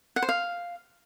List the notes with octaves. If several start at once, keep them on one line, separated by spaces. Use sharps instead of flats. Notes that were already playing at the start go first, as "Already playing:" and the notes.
F#5
C5
F5